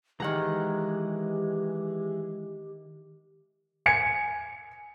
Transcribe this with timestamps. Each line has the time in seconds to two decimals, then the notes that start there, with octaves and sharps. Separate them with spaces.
0.20 D#3 E3 G#3 G4 F#5 A#5
3.86 G#5 G#6 C#7